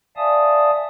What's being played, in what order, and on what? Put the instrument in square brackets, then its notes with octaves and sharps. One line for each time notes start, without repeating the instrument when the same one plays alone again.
[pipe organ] D5 E5 F5 G#5 A5 D#6